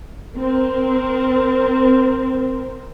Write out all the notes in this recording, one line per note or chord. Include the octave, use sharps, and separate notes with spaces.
C4 A#4